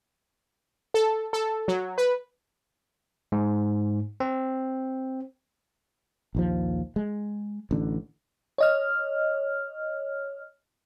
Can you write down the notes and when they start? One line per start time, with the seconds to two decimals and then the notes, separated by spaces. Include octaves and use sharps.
0.94 A4
1.33 A4
1.68 F#3
1.98 B4
3.32 G#2
4.20 C4
6.35 A#1 D#2 F3
6.96 G#3
7.71 A1 D3
8.58 C#5 D#5 F6